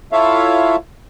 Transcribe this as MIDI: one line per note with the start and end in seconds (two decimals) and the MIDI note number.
0.12 0.76 64
0.12 0.76 65
0.12 0.76 69
0.12 0.76 73
0.12 0.76 76
0.12 0.76 77